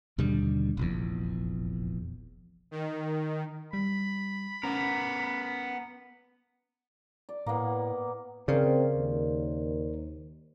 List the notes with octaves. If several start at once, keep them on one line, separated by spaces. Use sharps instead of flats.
D#2 B2 D3 G3
F1 A#1 E2
D#3
G3 B5
B3 C#4 A#4
D5
A2 A#3 B3
C#3 C4 A#4 C5 D5
D#2